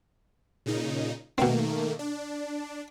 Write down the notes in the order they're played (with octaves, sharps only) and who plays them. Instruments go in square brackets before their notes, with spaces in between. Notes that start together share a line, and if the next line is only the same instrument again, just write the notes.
[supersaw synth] A#2 C#3 D#4
[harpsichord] B2 C4 [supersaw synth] D#3 A3 A#3
[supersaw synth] D4